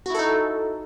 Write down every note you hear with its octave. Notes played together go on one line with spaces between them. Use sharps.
D#4 E4 F#4 A4